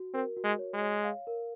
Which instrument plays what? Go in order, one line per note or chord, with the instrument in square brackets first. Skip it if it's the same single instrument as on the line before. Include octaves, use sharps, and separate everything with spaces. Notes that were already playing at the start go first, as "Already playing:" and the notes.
Already playing: [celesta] F#4
[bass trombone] C4 [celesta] A#4
[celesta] F#4
[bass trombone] G#3
[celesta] C#5
[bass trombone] G#3
[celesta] C#5
F5
A#4